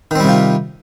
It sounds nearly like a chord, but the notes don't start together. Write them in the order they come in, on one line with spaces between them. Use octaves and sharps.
D#3 C4 G3 C3 F4